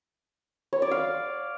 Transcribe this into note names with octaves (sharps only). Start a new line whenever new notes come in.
C#5
D5
F5